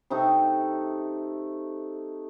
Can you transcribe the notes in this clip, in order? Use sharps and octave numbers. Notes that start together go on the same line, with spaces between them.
C3 A3 D#4